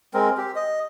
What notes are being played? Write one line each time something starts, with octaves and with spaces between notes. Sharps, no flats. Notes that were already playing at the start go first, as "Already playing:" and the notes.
G#3 C4 A#4
G4
D#5